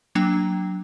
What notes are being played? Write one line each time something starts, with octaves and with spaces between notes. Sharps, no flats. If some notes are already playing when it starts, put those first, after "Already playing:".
F#3 A#3 D4 G5